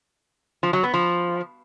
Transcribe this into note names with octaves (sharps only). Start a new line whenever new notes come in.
F3
F#3
B3
F3